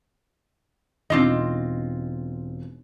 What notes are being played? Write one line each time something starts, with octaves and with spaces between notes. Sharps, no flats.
E1 C4 D4 D#4 F4 D#5